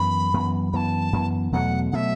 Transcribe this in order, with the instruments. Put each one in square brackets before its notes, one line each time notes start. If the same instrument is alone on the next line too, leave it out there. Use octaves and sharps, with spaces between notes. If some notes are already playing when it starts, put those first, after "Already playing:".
Already playing: [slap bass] F#2 E3 B3 [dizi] B5
[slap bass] F#2 E3 B3
[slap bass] F#2 E3 B3 [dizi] A5 B5
[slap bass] F#2 E3 B3
[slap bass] E2 B2 F#3 A3 [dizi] F#5
[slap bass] B2 F#3 A3 [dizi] E5 F#5